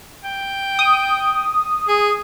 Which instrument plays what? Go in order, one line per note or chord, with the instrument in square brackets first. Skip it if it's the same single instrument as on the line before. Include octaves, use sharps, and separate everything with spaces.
[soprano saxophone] G5
[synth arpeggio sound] D#6
[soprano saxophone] G#4